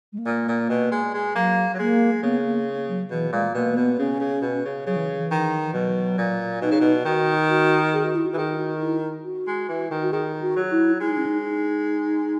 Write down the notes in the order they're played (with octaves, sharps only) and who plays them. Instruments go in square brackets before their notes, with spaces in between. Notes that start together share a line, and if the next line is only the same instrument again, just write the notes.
[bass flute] G#3
A#3
[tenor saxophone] A#2
A#2
B2
G#3
G#3
[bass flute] F#3 [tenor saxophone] A#3
[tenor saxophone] F#3
[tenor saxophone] G#3 [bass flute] A#3
[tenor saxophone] C#3 [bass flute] B3
[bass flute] A#3
F#3
[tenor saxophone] B2 [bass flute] E3
[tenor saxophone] A#2 [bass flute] G#3
[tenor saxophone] B2 [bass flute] A#3
[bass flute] A#3
[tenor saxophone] B2 [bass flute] B3
[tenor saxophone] C#3 [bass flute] C#4
[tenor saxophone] C#3
B2
C#3
[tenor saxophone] C#3 [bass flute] F#3
[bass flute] E3
E3
[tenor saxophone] D#3
[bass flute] E3
[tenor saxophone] B2 [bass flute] F#3
[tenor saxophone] A#2
[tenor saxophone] B2 [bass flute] D#4
[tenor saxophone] C#3
B2
[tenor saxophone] D#3 [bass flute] F#4
[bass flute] F#4
G#4
F#4
E4
F#4
[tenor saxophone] E3
[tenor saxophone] D#3 [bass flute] G#4
[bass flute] E4
F#4
E4
F#4
[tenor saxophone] G#3
E3
D#3
[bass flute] F#4
[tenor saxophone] D#3 [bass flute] G#4
[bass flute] F#4
[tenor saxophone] F#3
[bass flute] E4
[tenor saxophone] G#3 [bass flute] E4
[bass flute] D#4
C#4
D#4
D#4